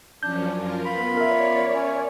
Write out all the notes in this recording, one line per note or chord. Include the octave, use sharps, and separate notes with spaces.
F#2 F3 C#4 D4 G6
F4 A#4
B3 F4 B5
A#4 C#5 D5 E5
C#4